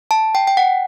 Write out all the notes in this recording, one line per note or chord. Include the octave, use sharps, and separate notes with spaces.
A5
G5
G5
F#5